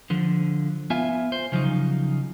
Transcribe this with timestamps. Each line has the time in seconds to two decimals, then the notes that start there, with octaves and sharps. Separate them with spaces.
0.10 D3 F3
0.90 B3 F4 E5 G#5
1.32 C5
1.52 C#3 F3 F#3 D#4